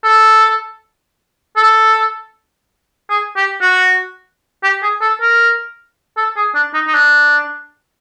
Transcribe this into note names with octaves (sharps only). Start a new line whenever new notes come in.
A4
A4
G#4
G4
F#4
G4
G#4
A4
A#4
A4
G#4
D4
D#4
D#4
D4